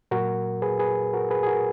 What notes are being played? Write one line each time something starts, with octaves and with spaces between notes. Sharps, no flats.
A#2 F#3 F#4 A#4
G#4 B4
G#4 B4
F#4 A#4
G#4 B4
G#4
F#4 A#4